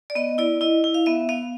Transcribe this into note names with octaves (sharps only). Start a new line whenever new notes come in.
D5
B3 D#5
E4 D5
E4 D#5
E4
F5
B3 E5
B3 F5